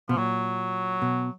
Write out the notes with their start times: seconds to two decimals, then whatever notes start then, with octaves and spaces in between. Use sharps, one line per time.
0.09 B2 F3
0.17 A#2 F#3
1.02 B2